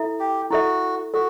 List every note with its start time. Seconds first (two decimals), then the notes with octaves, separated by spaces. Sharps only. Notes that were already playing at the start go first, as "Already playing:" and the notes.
Already playing: E4 A4 E5
0.20 G4
0.50 E4 F#4 A4 E5
1.14 F#4 A4